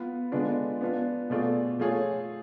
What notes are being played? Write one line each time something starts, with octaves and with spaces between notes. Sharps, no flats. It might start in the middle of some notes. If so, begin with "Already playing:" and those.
Already playing: B3 F4 B4 F5
D3 G#3 B3 D4 F4
B3 D4 F4
B2 A3 F4 G#4 D5
A3 F4 G#4 C#5